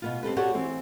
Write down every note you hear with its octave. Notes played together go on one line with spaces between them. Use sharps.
B2 B3 F4
C4 G4 A4 B4
F#4 G4 A4 C#5 D5 F#5
E3 C4